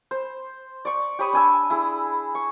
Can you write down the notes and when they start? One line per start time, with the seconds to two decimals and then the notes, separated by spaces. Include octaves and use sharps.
0.11 C5
0.85 D5 C#6
1.19 G4 C#5 B5 D#6
1.33 D4 G#5 E6
1.70 E4 G#4
2.35 C#6